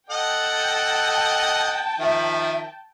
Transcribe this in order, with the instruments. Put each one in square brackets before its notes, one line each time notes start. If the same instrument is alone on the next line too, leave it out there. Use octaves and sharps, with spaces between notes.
[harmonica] A4 D#5 F#5 [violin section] G5 A5
[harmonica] D#3 F3 [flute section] E5